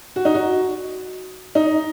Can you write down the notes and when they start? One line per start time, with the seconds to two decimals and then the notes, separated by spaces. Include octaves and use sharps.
0.16 F#4
0.25 D#4
0.34 F#4
1.55 D#4